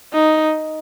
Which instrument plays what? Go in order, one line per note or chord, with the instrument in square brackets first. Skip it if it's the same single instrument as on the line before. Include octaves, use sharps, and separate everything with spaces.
[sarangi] D#4